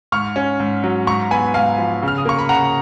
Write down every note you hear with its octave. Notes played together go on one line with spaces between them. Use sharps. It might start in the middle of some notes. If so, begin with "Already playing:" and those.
G#2 C#6 F6
C#4
G#2
F#3
G#2 A#5 C#6
B3 G#5 B5
G#2 F5 G#5
F3
C#3
F6
D#6
A#3 C#6
B5
C#3 F#5 A#5